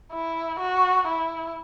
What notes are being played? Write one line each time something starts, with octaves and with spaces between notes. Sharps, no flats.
E4
F#4
E4